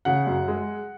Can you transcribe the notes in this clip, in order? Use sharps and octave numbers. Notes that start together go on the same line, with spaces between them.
C#3 F#5
F#2
G#3